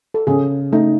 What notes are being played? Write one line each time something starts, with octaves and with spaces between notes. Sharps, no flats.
A4
C#3 G#4
A3 D#4